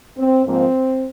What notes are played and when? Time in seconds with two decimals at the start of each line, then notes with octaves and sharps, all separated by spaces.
0.18 C4
0.46 G#2 F3 A#3 C4